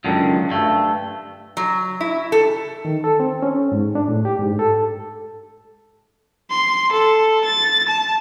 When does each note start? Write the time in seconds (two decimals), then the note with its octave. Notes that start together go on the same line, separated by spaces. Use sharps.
0.04 C#2 F#2 D3 D#3
0.51 G2 A3
1.57 F#3
2.01 E4
2.32 A4
2.85 D#3
3.04 A4
3.20 C4
3.42 C#4
3.72 G#2
3.95 D4
4.09 A2
4.25 G4
4.39 G#2
4.59 A4
6.51 C6
6.92 A4
7.45 A6
7.89 A5